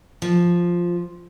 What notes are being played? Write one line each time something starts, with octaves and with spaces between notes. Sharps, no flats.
F3